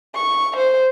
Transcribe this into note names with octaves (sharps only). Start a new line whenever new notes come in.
C#6
C5